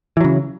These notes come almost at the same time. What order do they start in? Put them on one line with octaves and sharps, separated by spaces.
E3 F#3 C#3